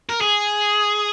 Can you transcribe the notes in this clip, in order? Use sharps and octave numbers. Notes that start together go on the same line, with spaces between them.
A#4
G#4